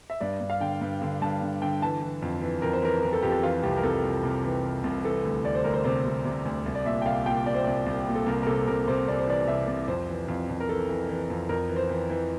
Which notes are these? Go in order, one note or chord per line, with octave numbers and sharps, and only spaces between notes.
E5
G2 D5
G2
F5
D3 G5
G2
D3
G2 A5
D3
D3 G5
E3 A5
E3
F2
E3
F2 A#4
C5
E3 A#4
E3 A#4
A4
F2 G4
A4
E3 F4
C2 G4
A#4
C2 A4
C2
C3
E3
E3
C2
E3 A4
D2
D2 D5
C5
D2 A#4
C5
C3 C5
C3
C3
D2
C2
D5
A#2 E5
G5
C2 F5
A#2 G5
A#2 D5
C5
C2 D5
C2
A#2
A4
C2 A#4
A#4
C3 A4
C3 A#4
C3 C5
C2 D5
C5
E3 D5
C2 E5
C2
F2 C5
E3
F2
F2
A#4
E3 A4
E3
E3
F2
F2 A#4
E3
C5
E3
E3